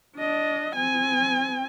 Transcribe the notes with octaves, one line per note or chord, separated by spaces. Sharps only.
D4 D#5
C4 G#5